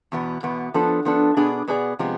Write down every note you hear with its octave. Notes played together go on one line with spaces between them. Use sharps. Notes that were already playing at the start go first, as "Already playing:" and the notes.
E2 B2 B3
E2 B2 B3
F3 B3 D4 A4
F3 B3 D4 A4
B2 B3 D4 G#4 D5
B2 B3 D4 G#4 D5
C3 F3 G#3 B3